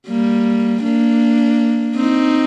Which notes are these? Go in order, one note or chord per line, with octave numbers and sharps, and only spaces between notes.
G3 A#3
A#3 D4
C4 D#4